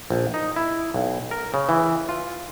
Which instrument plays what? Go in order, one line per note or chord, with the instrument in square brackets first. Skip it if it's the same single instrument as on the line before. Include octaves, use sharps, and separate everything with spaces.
[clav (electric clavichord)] A#1
D#4
E4
B1
A#4
C#3
E3
F4